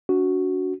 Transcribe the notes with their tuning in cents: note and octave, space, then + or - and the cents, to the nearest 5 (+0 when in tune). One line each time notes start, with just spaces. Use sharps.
D4 -40 F#4 +0